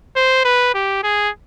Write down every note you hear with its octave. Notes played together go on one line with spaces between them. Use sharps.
C5
B4
G4
G#4